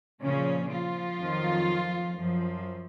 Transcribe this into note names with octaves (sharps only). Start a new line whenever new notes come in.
A#2 C#3 F3 C#4
F3 F4
F2 D#3 F#3
F#2 F3